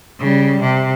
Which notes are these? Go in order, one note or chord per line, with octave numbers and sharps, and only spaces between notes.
C#3 G3
C3